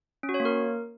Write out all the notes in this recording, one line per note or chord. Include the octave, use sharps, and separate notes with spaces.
C#4
F#4
C#5
A#3
A#4